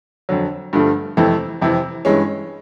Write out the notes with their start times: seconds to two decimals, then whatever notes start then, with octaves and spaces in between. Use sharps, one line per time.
0.29 F2 D3 F#3
0.73 G2 D3 F3 A3
1.17 F2 C3 E3 A3
1.61 F2 C3 E3
2.05 G2 E3 G#3 C#4